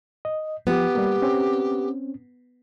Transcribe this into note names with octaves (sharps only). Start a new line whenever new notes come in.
D#5
F3 B3 G4
G3 A#3
C4 C#4